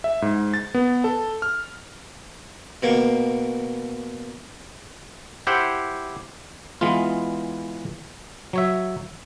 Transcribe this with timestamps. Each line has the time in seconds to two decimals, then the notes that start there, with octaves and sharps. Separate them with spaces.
0.04 E5
0.22 G#2
0.54 A6
0.74 B3
1.04 A4
1.42 F6
2.83 B2 A#3
5.47 E4 G4 C5 F#5
6.81 E3 G#3 B3 F4
8.53 F#3 C#5 E5